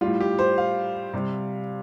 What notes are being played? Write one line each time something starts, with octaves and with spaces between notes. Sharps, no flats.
A2 G3 F4
G4
C5
F5
C3 G3